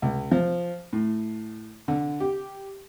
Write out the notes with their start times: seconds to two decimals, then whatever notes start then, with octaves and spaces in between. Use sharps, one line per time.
0.02 C#2
0.31 F3
0.93 A2
1.88 D3
2.20 G4